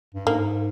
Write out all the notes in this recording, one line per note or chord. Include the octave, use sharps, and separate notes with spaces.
G2
G#2 A#3